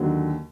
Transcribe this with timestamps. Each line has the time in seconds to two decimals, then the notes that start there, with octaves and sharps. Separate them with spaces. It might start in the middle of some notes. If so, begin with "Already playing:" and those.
Already playing: D#2 D3 F#3